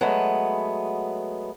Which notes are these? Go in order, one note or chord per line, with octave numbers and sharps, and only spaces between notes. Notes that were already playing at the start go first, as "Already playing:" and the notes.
F#3 G#3 A3 B3